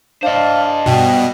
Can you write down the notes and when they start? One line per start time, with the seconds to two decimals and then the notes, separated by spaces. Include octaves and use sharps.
0.23 D4 C5 D#5 F5
0.86 G2 B2 G5